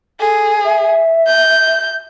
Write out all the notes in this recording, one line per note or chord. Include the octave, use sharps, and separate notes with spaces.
G#4 A4
E5
G6